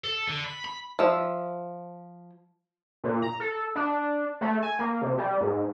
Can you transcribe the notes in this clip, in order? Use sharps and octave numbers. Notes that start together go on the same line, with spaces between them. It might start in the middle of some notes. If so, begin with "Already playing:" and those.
A4
D3
B5
B5
F3 E5
A#2
A#5
A4
D4
A3
G#5
A#3
C3
G3
G#2